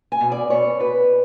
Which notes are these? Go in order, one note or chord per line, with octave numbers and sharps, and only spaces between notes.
G#5
B2
D5
B2 C#5
B2 B4